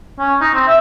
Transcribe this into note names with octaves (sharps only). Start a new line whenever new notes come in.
C#4
D#4
C4
E5